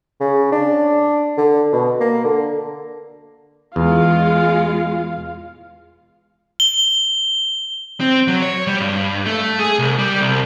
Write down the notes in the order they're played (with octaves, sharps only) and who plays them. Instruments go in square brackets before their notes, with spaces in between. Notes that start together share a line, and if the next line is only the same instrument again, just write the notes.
[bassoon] C#3
D4
D3
B2
A#3
D3
[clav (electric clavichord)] E2 [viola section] G#3 F4 [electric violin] F5
[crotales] G7
[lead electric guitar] C4
F#3
C#5
G3
G2
A3
G#4
C2
G3
C2